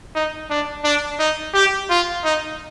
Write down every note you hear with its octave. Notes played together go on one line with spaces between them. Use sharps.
D#4
D4
D4
D#4
G4
F4
D#4